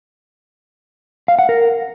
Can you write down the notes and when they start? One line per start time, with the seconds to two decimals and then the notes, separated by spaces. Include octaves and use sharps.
1.28 F5
1.39 F#5
1.49 A#4